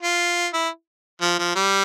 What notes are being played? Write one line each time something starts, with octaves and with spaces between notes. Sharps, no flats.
F4
E4
F3
F3
G3